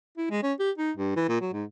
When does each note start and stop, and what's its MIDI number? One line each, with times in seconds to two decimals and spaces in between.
0.18 0.28 64
0.30 0.41 56
0.43 0.53 61
0.60 0.71 67
0.78 0.91 63
0.97 1.12 43
1.16 1.24 52
1.29 1.38 46
1.41 1.50 54
1.53 1.64 44